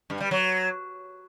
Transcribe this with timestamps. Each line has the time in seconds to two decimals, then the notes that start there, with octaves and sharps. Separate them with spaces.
0.10 G2
0.20 G3
0.31 F#3